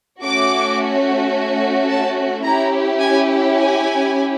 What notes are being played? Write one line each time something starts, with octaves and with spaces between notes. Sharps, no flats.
A3 C#4 F#4 D6
A5
C#4 E4 G4 A#5
G#5
G#5